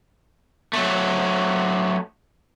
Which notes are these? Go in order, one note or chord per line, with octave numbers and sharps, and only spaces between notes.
F#3 A3